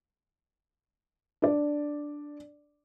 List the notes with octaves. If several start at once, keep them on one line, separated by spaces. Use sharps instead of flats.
D4 D5